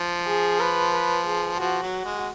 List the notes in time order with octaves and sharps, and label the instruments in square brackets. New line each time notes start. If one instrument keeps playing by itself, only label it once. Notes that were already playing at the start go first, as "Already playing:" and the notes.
Already playing: [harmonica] F3
[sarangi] G#4
B4
B4
G#4
[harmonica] F3 [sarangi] F#4
[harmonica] F#3
G#3